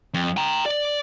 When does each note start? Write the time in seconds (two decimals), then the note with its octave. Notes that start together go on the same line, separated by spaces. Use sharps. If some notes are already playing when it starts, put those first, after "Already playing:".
0.14 F2
0.37 G5 A#5
0.66 D5